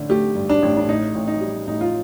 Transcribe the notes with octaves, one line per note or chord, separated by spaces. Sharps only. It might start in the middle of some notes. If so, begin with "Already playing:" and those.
Already playing: A1 D3
A3 G4
G2
D4
A1
D4
A2 D#4
A1
D#4
G3
A1 D#4
F4